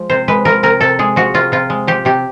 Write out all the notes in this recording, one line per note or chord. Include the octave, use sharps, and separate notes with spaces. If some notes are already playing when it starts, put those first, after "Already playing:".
Already playing: F3 G#3
C3 C5
G#3 B4
F3 A#4
C3 A#4
C3 A4
G#3 G#4
F3 F#4
C3 F4
C3 F4
G#3
F3 G4
C3 G4